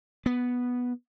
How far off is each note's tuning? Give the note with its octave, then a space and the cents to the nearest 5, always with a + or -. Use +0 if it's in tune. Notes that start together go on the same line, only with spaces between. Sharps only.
B3 -5